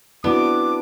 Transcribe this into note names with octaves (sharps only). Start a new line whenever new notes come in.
B3 C4 D4 E4 F#4 D6